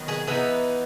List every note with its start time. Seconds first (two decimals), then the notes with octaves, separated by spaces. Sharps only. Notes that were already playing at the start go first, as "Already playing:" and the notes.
Already playing: D#3 F#3 B3
0.08 G#4 B4
0.27 E3 B3 D#4 G#4 B4